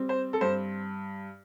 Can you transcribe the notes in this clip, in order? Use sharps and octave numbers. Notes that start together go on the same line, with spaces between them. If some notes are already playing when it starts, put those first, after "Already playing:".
Already playing: G3 C4
C5
A4
G2 C5